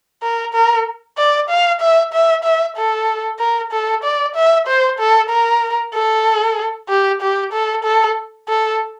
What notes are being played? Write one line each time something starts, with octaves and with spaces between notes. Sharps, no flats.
A#4
A#4
D5
F5
E5
E5
E5
A4
A#4
A4
D5
E5
C5
A4
A#4
A4
G4
G4
A4
A4
A4